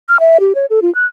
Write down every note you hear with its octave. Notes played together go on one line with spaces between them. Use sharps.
F6
E5
G4
C#5
A4
F4
F#6